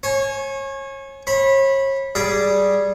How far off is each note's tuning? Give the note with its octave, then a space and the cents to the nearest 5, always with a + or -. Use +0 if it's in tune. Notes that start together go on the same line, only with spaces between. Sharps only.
C#5 -30 G#5 +20
C#5 -40 B5 -10
G3 -5 G#4 +0 D5 +0